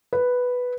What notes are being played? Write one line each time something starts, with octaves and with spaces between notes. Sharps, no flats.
B4